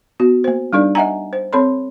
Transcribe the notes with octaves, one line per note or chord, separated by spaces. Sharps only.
B3 F#4
A#3 C5
G3 D4 D#4 A4 D5
D#5 E5 F#5 G#5 A#5
C5
C4 A4 C#5 B5 C6